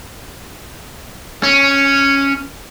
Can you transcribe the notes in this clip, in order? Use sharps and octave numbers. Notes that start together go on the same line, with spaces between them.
C#4